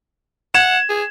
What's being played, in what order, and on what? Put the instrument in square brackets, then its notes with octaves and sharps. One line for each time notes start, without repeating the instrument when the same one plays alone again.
[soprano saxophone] F#5 [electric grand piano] G#6 E7
[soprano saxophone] G#4